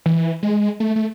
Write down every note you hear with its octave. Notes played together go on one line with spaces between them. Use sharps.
E3
G#3
A3
A3